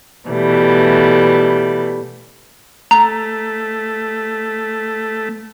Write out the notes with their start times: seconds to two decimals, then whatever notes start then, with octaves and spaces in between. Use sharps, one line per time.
0.28 B2 E3 G3 A3
2.91 A3 A#5